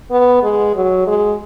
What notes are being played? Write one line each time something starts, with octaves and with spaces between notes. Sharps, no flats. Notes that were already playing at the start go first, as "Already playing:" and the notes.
B3
G#3
F#3
G#3